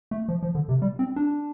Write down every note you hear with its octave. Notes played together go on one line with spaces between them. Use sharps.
A3
F3
F3
D3
C3
G3
C4
D4